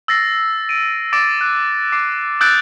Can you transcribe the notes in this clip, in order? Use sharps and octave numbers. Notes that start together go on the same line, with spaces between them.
E6 A6 A#6 C7
D7 D#7
D6 A6 D7
F#6
D6 C7 D7
D#6 E6 F#6 G6 A6 D7